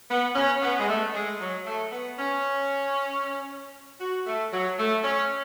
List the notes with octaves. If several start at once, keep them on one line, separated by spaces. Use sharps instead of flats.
B3
C#4
B3
G#3
A3
G#3
F#3
A3
B3
C#4
F#4
A3
F#3
A3
C#4